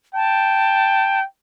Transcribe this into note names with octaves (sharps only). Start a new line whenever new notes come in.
G5 A5